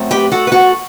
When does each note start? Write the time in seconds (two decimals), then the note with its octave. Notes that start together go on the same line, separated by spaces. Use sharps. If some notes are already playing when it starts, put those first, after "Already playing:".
Already playing: F#2 F#3 A3 C4
0.11 G4 B4
0.32 F#4 A4
0.47 B4
0.52 F#4 A4